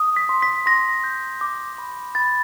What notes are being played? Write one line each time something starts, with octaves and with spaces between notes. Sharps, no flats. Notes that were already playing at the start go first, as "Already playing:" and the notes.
Already playing: D#6
B6
C6
B6
C6 A#6
G6
D6
B5
B5 A6